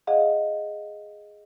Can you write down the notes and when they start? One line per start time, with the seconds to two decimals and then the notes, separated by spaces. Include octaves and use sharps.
0.07 G#4 D#5 F5 F#5